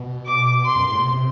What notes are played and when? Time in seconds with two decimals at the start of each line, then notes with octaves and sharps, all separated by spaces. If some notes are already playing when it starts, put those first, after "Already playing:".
Already playing: B2
0.26 D6
0.65 C6
0.75 F#2
0.83 G2
0.90 A2
0.97 B2
1.05 C3